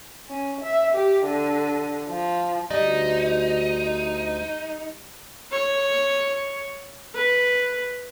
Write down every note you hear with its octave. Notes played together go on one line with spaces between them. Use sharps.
C#4
E5
G4
D3
F3
D2 G3 D#4 D5 D#5
C#5
B4